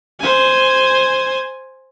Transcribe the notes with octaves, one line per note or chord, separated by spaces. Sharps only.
C5 G#5